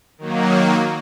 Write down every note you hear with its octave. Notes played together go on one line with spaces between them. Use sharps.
D#3 F#3 A#3